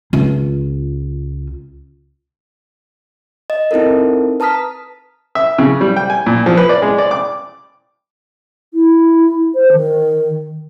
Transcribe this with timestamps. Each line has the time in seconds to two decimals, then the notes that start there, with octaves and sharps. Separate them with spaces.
0.13 C#2 F4
3.50 D#5
3.71 C4 D#4 E4 A4 A#4
4.40 B4 A5 A#5 D#6 F6 B6
5.35 E5
5.58 C#3
5.81 G3
5.96 G5
6.10 G#5
6.26 A#2
6.46 F3
6.57 B4
6.69 D5
6.82 G#3
6.98 D5
7.11 D6
8.74 E4
9.55 C5
9.72 D#3